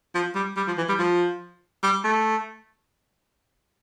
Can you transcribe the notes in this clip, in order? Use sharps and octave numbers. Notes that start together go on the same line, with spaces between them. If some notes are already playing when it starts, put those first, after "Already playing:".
F3
G3
G3
F3
E3
G3
F3
G3
A3